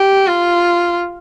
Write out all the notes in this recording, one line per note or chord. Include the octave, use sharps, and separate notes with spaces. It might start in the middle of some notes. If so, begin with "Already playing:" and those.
Already playing: G4
F4